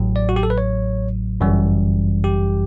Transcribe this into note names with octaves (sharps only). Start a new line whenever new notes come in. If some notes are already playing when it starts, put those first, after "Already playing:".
Already playing: A1 A2 F#3
D5
F#4
G4
A4
B4
C#5
G1 F#2 E3 G3
G4